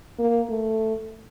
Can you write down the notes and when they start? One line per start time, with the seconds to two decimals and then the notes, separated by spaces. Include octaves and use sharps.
0.19 A#3
0.50 A3